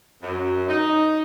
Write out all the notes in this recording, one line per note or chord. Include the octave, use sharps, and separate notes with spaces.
F#2
D#4